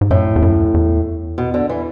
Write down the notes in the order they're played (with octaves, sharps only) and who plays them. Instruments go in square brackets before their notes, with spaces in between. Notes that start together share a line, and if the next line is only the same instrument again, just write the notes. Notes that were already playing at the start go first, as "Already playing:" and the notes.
[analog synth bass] G#2
[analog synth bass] F#2 [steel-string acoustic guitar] A2
[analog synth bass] E2
F#2
E2
[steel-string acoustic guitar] B2
D3
E3